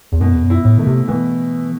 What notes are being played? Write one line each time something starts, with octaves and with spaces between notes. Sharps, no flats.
E2
F#2 B2
E2
F#2
E4
A2
D#3 A3
C3
B2 E3